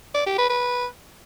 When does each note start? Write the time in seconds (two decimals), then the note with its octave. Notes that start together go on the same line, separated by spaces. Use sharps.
0.15 D5
0.26 G4
0.38 B4
0.50 B4